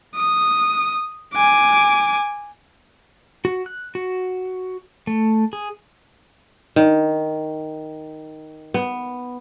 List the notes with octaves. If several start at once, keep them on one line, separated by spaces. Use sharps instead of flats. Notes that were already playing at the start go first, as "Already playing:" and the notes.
D#6
G#5 D6
F#4
F#6
F#4
A3
G#4
D#3
B3